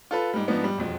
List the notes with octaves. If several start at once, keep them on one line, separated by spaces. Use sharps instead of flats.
F4 A4 B4
G#2 G3
G#2 F3 B3 D4
G3
E1 F2